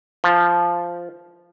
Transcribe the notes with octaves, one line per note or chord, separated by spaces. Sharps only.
F3